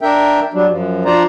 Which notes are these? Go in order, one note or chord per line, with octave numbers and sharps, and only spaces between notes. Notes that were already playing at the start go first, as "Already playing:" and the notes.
D4 A#4 E5 G5
F#3 G3 D4
F#2 F3
F3 D4 F4 C5 D5 A#5